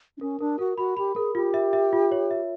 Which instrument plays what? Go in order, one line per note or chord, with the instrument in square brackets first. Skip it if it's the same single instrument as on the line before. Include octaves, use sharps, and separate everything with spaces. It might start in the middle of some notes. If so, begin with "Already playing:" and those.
[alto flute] D4
[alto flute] C#4 [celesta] A#4
[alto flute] D4 [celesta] A#4
[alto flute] F#4 [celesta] A#4
[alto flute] F#4 [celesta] B5
[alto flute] G4 [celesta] B5
[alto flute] G#4 [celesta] A#4
[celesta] F4 [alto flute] G4
[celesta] E5
E5
F4
C#5
E5